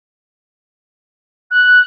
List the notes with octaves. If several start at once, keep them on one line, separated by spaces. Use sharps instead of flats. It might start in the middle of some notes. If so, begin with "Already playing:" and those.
F#6